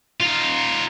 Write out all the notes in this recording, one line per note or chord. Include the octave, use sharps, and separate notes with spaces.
D#4 F4